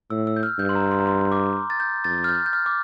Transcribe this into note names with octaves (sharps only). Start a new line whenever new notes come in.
A2 E6
E6
G6
F6
G2 G6
C6
A#5
C6
A#5
C6
D6
A6
G6
F2 A6
F6
G6
G6
F6
D6